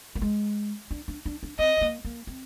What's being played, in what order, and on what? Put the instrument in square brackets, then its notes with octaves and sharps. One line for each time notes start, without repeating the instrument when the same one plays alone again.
[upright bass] A#3
G#3
D4
D4
D4
D4
[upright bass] C4 [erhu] D#5
[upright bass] C4
A#3
A#3
C4